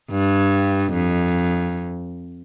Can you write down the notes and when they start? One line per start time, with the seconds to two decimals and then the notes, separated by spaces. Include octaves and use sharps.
0.11 G2
0.93 F2